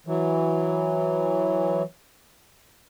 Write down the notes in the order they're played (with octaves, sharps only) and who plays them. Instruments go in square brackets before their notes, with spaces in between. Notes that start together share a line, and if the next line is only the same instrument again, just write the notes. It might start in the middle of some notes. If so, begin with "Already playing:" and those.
[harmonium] E3 F#3